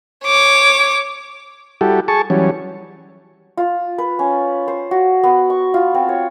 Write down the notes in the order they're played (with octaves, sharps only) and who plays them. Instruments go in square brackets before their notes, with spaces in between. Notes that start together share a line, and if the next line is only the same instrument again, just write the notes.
[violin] C#5 D6
[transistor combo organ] G3 E4 F#4 G4 A4
G#4 A5 C#6
E3 F#3 G3 C#4
[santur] F4
B4
C#4
C5
F#4
B3
C#6
F4
C4
C#5